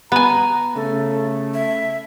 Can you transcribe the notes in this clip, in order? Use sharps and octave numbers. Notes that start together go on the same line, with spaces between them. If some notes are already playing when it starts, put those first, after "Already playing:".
B3 G#5 A#5
C#3 A3 A4
E5